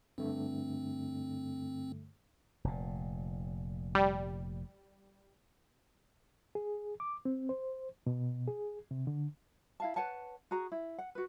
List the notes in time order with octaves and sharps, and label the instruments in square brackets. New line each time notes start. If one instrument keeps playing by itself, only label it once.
[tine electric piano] G2 D3 A3 [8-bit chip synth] C4
[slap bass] F1 A#2
[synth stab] G3
[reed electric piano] G#4
D6
C4
C5
B2
G#4
C3
D3
[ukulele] E4 F5 A5
B4 C#5 F#5 A5
F#4 G#4 A#5
E4
F#5
F#4 B4